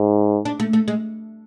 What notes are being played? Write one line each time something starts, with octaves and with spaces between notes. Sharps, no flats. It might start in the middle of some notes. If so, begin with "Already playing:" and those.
Already playing: G#2
D4
A3
A3
G#3